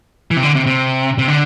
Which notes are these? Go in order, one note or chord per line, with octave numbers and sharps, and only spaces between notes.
E3
C3
D3
C3
C3
C3
D3